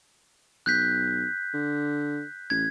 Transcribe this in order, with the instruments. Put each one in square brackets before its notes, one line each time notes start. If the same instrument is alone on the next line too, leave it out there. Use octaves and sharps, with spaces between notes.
[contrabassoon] B1 [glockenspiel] F#6 G6 B6
[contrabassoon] D3
[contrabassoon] A1 [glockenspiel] G#6